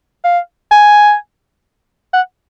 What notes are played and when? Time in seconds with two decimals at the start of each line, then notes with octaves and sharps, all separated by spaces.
0.24 F5
0.71 G#5
2.13 F#5